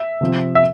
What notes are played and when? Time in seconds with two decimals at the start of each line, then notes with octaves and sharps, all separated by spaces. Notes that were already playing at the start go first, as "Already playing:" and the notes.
Already playing: E5
0.21 C3 F3 C4
0.55 E5